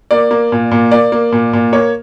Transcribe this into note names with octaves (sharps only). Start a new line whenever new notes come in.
A#3 D5
A#3
A#2
A#2
A#3 D5
A#3
A#2
A#2
A#3 C#5